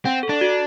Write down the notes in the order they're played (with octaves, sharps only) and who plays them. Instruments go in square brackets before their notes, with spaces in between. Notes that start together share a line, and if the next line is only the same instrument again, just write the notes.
[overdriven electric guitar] C4 [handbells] F#5
[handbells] A4
[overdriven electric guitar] D4
[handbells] F#4